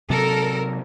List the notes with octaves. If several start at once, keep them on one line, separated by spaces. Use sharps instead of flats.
C3 F#3 A4 A#4